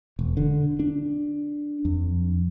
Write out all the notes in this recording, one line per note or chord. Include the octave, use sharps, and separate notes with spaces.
E1
D3
D4
F2